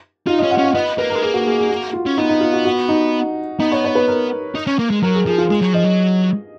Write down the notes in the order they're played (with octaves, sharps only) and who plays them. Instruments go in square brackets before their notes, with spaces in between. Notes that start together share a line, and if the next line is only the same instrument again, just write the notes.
[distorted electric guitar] D#4 [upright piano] F4
[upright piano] D#5
[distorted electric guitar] C#4
[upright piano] F#5
[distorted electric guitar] C#4 [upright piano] F5
[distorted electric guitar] B3 [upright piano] D#5
[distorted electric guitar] A#3 [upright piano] B4
[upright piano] A#4
[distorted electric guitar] G#3
[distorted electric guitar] A#3 [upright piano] G#4
[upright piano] F#4
G#4
G#4
F#4
F4
[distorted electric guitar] C#4
[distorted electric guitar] B3 [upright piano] D#4
[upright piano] D#4
F4
F#4
F#4
D#4
[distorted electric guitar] B3 [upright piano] D#4
[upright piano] C#5
C#5
B4
A#4
[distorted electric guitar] D#4
C#4
A#3
G#3
[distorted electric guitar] F#3 [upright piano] A#4
[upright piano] G#4
[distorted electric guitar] F3 [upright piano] G#4
[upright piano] F4
[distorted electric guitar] G#3 [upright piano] G#4
[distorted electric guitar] F#3
[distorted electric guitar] F3 [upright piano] D#5
[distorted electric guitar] F#3